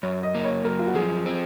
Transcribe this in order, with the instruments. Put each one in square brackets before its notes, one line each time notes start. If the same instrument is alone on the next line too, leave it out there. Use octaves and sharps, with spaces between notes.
[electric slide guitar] F#2 [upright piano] C#5
[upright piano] D#5
[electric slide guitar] A#3 [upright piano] D#5
[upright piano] C#5
[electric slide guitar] F#2 [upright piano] A#4
[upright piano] F4
F#4
[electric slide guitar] F3 [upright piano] G#4
[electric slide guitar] C4